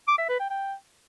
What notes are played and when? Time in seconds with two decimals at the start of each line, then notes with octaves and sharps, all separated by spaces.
0.08 D6
0.18 E5
0.29 B4
0.39 G5
0.50 G5